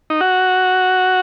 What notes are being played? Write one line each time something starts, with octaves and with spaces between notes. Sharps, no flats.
D#4
F#4